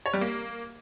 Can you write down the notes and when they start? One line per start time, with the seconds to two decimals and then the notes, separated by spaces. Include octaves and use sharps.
0.06 C#5
0.13 G3
0.21 A#3